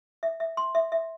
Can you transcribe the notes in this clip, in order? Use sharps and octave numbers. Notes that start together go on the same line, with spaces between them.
E5
E5
C6
E5
E5